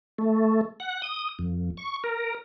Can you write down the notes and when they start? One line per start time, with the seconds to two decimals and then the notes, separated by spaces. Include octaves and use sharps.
0.18 A3
0.80 F#5
1.02 D#6
1.39 F2
1.77 C#6
2.04 A#4